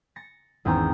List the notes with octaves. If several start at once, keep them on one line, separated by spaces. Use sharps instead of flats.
A6 A#6 C#7
G#1 E2 C4 C#4 A#5 G6